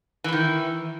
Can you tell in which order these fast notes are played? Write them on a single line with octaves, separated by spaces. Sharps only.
E3 E4 D#3